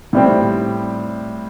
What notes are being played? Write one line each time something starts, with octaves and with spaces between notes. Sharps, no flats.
A2 G3 C4